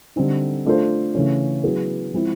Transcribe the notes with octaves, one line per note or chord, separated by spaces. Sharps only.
D3 G3 C4 D#4
A3 D4 F4 A4 C5
C#3 E3 A3 C#4
F#3 B3 E4 G#4
F3 G#3 C4 E4